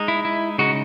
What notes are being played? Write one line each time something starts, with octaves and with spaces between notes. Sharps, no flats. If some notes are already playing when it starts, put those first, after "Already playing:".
Already playing: G#3 D#4
E4
E4
C#3 G#3 D#4 F#4